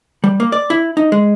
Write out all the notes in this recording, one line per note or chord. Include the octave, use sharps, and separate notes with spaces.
G3
A#3
D5
E4
D#4
G#3